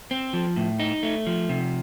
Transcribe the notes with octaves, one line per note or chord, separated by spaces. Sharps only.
C4
F3
A2
D#4
A3
F3
C3